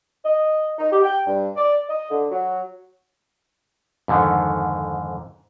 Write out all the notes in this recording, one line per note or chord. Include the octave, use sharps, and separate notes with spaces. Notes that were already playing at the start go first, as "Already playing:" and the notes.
D#5
D#4
G4
G5
G2
D5
D#5
D3
F#3
F2 G#2 D3 D#3